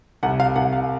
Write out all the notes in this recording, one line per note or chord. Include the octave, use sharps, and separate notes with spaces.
C2 F#5
F5
C2 F#5
F5